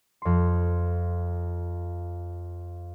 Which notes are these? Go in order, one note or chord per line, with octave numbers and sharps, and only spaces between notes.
F2 C6